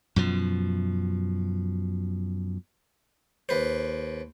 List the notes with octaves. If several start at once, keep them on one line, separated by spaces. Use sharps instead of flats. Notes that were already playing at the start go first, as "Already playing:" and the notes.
F#2 B2 F3
D#2 B4 C5